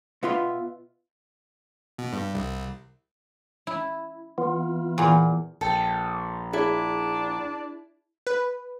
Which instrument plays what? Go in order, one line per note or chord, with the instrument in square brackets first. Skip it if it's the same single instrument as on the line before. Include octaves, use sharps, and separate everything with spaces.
[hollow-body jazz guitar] B2 B3 F4 E5 C6
[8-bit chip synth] B2
G2
C2
[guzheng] E4
[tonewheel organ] E3 B3 F4
[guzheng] E2 A#2
[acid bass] A#1 [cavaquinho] A4 G5
[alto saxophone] D4 [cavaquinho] E4 [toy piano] G#4 D5
[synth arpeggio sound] B4